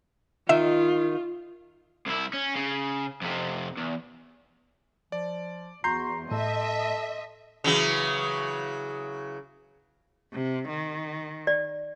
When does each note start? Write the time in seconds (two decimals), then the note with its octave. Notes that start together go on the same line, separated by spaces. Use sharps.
0.49 D#3 F4 E5
2.06 C2 E4
2.33 C#4
2.56 C#3
3.22 F2 C3
3.77 E2
5.12 F3 D5
5.84 E2 F#4 A#5 C6 G6 C7
6.31 A2 A4 D#5 E5
7.64 C#3 E3 F#3
10.33 C3
10.68 D#3
11.47 D5